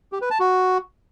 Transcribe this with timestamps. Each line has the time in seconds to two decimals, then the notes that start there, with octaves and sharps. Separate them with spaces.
0.12 G4
0.21 B4
0.31 A5
0.40 F#4